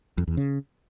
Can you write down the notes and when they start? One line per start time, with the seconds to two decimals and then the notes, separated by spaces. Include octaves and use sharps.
0.18 F2
0.28 E2
0.37 C#3